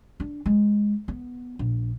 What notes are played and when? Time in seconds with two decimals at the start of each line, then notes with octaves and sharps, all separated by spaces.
0.20 D4
0.46 G#3
1.08 B3
1.59 A#1